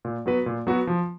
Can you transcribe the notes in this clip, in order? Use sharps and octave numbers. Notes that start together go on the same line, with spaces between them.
A#2
F#3 B3 F#4 B4
A#2
F#3 B3 F#4 B4
F3